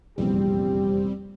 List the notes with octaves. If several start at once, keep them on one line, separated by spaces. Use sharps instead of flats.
F1 A#1 E2 G3 C4 G4